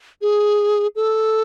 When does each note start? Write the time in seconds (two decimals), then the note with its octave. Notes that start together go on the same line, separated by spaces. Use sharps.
0.22 G#4
0.95 A4